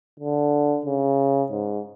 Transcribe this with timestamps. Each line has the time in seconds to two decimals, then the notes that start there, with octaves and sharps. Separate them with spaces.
0.20 D3
0.86 C#3
1.51 G#2